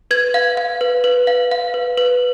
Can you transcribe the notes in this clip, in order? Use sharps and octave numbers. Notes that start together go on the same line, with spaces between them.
B4 G#6
F5
F5
B4
B4
F5
F5
B4
B4